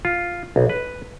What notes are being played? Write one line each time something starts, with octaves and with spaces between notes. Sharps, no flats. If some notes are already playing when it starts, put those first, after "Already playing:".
F4
B1
B4